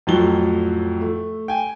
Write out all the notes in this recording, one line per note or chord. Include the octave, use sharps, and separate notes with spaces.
F2 A2 F3 F#3 G7
A3
G5 G#5